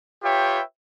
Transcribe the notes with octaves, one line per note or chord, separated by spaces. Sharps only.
F4 G4 B4 C#5 E5 G5